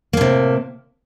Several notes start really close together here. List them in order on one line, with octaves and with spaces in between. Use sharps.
A#3 A2 C3